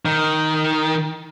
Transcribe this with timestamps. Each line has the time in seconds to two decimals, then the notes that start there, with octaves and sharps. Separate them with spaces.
0.05 D#3